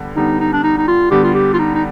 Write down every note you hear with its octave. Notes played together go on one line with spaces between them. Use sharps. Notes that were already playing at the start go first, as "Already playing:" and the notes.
Already playing: D3 G3 B3
D3 G3 B3 D#4
D#4
D4
D#4
D#4
F4
D3 G3 B3 G4
F4
G4
F4
D#4
D#4